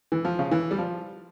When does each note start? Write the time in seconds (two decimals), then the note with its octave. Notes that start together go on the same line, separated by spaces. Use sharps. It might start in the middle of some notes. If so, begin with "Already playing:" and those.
0.12 E3
0.25 F3
0.39 C#3
0.51 E3
0.71 G3
0.78 F3